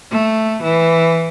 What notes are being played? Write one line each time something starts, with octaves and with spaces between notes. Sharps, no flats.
A3
E3